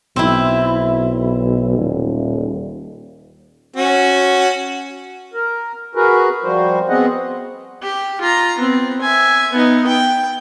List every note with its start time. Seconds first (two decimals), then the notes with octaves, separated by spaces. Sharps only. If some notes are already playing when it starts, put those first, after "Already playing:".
0.16 B1 C4 E4
1.78 D#1
3.76 C#4 F#4
5.34 A#4
5.95 F#4 G#4 A#4 B4
6.44 F3 G3 F#4 C5
6.89 B3 C4 G#4 D#5 F#5
7.82 G4
8.21 F4 A#5
8.59 B3 C4
9.01 E5 G#5
9.52 B3 D#4
9.87 G5